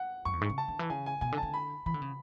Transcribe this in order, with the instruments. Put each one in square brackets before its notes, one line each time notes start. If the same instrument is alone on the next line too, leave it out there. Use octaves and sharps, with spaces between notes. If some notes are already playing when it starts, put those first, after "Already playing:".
Already playing: [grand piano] F#5
[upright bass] F#2 [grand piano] C#6
[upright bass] E2
[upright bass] G#2 [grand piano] C#6
[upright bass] C#3
[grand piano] A5
[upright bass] D3
E3
[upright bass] C#3 [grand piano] G#5
[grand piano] G#5
[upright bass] B2 [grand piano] G#5
[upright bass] D3
[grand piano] A5
[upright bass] D3
[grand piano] B5
[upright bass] E3 [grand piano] B5
[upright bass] D3
C#3